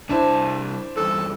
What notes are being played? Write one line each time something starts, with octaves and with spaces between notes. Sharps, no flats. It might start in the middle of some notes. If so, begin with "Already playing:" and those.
C2 D4 E4 C5 A5
E2 G2 A4